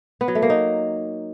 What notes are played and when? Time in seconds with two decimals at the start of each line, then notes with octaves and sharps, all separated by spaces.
0.21 B3
0.28 F#3
0.35 A3
0.42 A#3
0.50 D#4